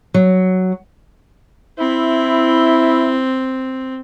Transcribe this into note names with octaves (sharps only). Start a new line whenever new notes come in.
F#3
C4 E4